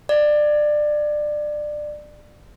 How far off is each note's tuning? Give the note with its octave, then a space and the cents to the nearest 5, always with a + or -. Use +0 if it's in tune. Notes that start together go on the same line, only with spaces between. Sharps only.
D5 +20